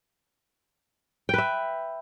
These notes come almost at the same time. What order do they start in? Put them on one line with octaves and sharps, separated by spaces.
G5 B4 E5